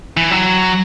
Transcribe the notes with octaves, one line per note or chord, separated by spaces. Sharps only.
E3
F#3